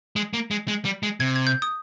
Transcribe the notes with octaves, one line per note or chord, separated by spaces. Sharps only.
G#3
A#3
G#3
G#3
G3
G#3
C3 G#6
G#6
G6
D#6